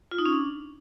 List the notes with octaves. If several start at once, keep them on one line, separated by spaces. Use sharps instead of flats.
F4
D#4
C#4
D4